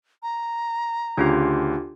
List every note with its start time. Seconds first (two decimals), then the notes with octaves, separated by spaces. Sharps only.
0.23 A#5
1.17 D2 C#3 D4 F4 G4